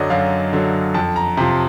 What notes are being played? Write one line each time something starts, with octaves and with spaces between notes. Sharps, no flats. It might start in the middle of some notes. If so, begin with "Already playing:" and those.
Already playing: F#2 D3 F#3 D5 D#5
F#2 F5
D3 F#3
F2 A5
A#5
C3 F3 C6